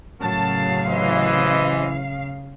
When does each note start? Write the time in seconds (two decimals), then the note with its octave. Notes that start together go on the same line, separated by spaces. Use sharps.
0.21 A2 C#3 F#3 F#4 A#4 F5 A5
0.87 C3 E3 C5 D#5